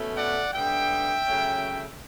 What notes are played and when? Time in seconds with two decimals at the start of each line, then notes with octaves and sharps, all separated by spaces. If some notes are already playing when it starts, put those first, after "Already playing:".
Already playing: B2 A3 C#4
0.17 D5 F#5
0.53 D3 G3 B3 E5 G5
1.27 C#3 F#3 A3 C#4